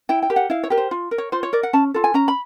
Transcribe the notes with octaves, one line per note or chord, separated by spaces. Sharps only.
E4 G5
G5
G4 A#4
F#5
E4 F5
C#5
G4 A#4
C5
F4
A#4
C#5
F4 C5
C#5
A#4 D5
F#5
C#4 A5
F4 A4
G#5
C#4 A#5
B5